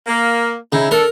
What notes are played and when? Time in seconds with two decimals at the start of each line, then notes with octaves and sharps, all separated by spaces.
0.06 A#3
0.73 C#3 D#4 E4
0.91 D4 A4 A#4